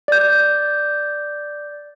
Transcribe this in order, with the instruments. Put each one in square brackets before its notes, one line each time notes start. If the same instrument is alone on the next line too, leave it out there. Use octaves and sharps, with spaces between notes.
[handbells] D5 G6